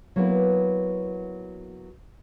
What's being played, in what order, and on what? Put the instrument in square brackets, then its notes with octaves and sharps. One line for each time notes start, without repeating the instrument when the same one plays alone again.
[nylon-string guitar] F#3 A#3 B3 E4